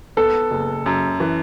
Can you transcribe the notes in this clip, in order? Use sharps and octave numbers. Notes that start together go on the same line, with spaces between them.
B3 A4
F#1
F#2
E3